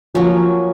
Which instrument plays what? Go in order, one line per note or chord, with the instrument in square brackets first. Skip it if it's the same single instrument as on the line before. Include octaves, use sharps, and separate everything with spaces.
[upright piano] F3 [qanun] F#3 A#3 C#4